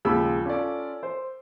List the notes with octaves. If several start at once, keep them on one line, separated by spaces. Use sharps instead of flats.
D#2 C#3 F3 G#3 B5 E6
C#4 F4 A4 D5
C5